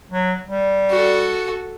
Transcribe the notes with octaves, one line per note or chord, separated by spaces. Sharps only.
F#3
G3
F#4 A4